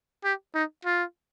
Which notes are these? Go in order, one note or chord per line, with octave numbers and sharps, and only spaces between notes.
G4
D#4
F4